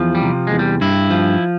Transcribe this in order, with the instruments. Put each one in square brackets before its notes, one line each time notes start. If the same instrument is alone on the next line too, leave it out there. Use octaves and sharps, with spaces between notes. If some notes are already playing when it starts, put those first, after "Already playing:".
Already playing: [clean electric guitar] E2 F3
G3
C3
E2 G#3
G3
G2 E4
F3